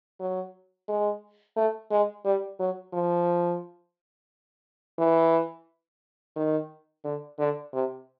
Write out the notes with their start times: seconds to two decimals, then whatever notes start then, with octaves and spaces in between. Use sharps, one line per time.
0.20 F#3
0.88 G#3
1.56 A3
1.91 G#3
2.25 G3
2.59 F#3
2.93 F3
4.98 E3
6.36 D#3
7.04 D3
7.39 D3
7.73 C3